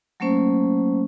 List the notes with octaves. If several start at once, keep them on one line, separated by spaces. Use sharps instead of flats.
F#3 A3 A#3 C#4 C5